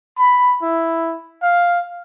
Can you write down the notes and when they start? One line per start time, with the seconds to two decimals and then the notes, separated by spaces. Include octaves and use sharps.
0.19 B5
0.62 E4
1.42 F5